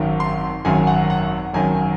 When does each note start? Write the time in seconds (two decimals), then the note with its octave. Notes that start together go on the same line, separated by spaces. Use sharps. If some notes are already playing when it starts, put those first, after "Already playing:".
Already playing: G#1 F#2 D#3
0.20 C6
0.65 G#1 F#2 D#3 G#5
0.87 F#5
1.10 F#5
1.53 G#1 F#2 D#3 G#5